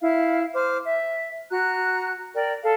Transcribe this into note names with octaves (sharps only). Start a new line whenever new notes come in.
E4 F5
C5 D6 F6
E5
F#4 A#5 F#6
A#4 D5 G5
A4 F5